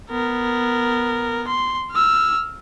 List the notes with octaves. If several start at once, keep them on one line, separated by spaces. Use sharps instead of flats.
B3 A#4
C6
E6 F6